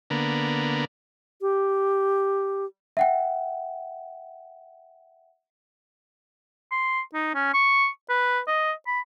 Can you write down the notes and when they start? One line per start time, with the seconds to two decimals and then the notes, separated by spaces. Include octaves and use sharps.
0.10 D3 A#3 B3
1.41 G4
2.97 E5 F#5 G5
6.71 C6
7.14 D#4
7.35 C#4
7.54 C#6
8.10 B4
8.47 D#5
8.87 B5